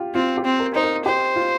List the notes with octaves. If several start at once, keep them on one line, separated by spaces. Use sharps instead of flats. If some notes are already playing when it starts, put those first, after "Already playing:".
Already playing: F4 G4
C4 F4
G4
C4
A#4
D#4 C5
A#4
G4 C5
F4